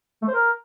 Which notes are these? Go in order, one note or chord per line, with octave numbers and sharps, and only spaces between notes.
A3
C5
A#4